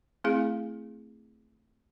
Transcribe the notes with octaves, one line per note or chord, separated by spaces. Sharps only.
A3 C4 E4 G#4 F5